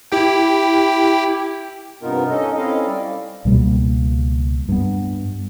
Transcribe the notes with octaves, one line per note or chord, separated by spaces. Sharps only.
E4 G4 G5
G2 C3 B3 D#4 F4 A#4
C#4 D#4 A4 D#5
C4 C#4 E4 A4 D#5 F5
G3 D5
C#2 B2 G3 A#3
G2 B3